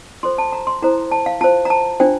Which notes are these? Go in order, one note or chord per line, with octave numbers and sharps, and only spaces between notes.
F4 A4 C5 C6
A5
A#5
C6
E4 A4 C5 A#5
A5
F5
F4 C5 A5
A#5
A5
D4 F4 C5 G5